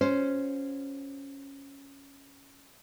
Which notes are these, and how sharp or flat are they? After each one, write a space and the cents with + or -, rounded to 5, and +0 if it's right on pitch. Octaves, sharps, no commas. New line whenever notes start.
C#4 +0 F#4 -35 C5 +0